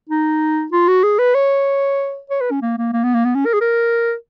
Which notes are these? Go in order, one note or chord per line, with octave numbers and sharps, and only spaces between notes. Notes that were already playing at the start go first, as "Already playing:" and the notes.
D#4
F4
F#4
G#4
B4
C#5
C#5
B4
C#4
A#3
A#3
A#3
B3
A#3
B3
C#4
A#4
G#4
A#4